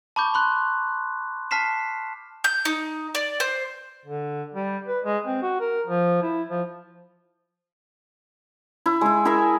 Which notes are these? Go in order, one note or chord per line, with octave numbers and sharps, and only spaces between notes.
A5 B5 C#6 D6 G6
B5 C6 F#6
A5 F6 B6 C7 E7
G6
D#4
D5
C5
D3
G3
B4
G#3
C4
F#4
A#4
F3
E4
F3
E4
G#3 E4
E4 G#4 A#4 E5